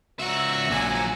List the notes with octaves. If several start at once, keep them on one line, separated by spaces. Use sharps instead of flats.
C#2 F#4 E5 A#5 E6
A#1 A#2 F#3 G#5 E6